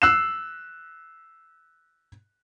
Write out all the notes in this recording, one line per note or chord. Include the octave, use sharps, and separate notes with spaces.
E6 F#6 C7 E7